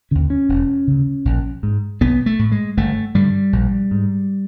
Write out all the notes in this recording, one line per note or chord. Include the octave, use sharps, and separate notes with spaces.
D#2 D3 C#4
C#4
E1
D2 C#3
A#1
G#2
B1 B3
A3
A2
G#3
G1 A3
G2 D3 G3
A#1
G#2